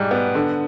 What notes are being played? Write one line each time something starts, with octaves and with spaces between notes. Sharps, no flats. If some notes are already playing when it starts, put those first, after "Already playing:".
Already playing: G#2 G3
B3
D3